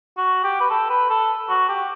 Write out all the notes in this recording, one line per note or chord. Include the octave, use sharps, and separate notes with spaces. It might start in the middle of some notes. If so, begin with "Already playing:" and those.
F#4
G4
B4
A4
B4
A4
F#4
G4